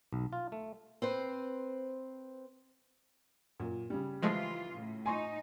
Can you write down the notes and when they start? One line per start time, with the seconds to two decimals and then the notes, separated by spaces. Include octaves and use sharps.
0.13 B1
0.33 F4
0.52 A3
1.02 C4 B4 C5
3.60 F#2 A#2
3.90 C#3 G3
4.22 E3 F3 G#3 A3 F4
4.74 A2
5.06 D#4 G#5 C6 C#6